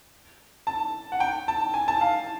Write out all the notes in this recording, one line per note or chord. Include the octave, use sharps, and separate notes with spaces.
A5
F#5
G5
A5
G#5
A5
F5